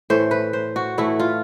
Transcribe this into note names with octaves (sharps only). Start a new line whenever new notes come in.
A2 E3 A3 C5
B4
C5
F#4
A2 E3 A3 E4
F4